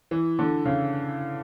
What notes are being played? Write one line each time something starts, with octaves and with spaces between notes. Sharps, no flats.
E3
D3
C#3